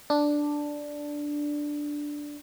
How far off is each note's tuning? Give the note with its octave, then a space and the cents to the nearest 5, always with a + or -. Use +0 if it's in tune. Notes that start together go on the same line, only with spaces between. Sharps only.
D4 +0